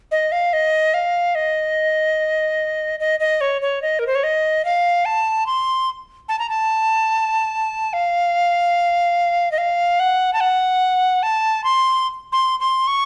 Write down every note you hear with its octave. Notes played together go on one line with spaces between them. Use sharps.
D#5
F5
D#5
F5
D#5
D#5
D#5
C#5
C#5
D#5
A#4
C5
C#5
D#5
F5
A5
C6
A5
A#5
A5
F5
D#5
F5
F#5
A5
F#5
A5
C6
C6
C6
C#6